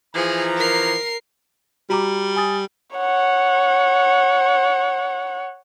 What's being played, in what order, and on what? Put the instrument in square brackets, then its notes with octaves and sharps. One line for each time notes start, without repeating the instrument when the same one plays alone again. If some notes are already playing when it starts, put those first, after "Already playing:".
[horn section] E3 F3 A#5 [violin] G#4
[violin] A#4 C7
[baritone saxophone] G3 [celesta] F#4 A#5 D6
[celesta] G#5 D#6 A6
[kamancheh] C#5 F#5